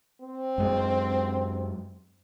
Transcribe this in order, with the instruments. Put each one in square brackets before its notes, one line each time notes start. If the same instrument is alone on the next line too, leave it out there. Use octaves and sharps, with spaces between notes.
[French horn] C4
[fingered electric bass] F#2 G#3